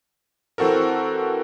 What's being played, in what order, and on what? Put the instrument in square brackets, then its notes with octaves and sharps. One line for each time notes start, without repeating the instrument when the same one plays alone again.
[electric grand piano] E3 C4 F#4 A4 A#4